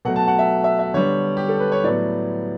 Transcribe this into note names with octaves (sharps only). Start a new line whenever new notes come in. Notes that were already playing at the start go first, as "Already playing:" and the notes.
B2 F#3 A3 F#5
A5
F#5
E5
E5
E5
D3 G3 B3 C#5
G4
A4
B4
C#5
A2 F#3 B3 D5